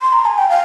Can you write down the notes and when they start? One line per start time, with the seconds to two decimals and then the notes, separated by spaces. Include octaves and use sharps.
0.02 C6
0.13 A#5
0.26 G#5
0.38 G5
0.49 F5